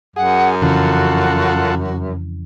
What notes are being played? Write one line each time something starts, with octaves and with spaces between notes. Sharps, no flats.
F#2 G#4 F#5
F2 C#3 E3 F4 F#4 A4 F#5